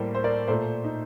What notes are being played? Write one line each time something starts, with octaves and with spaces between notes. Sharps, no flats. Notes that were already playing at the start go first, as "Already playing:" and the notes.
Already playing: A2 G3 A#3 A4 C5
C5
A#4 D5
A#2 A3 A4 C5
D#4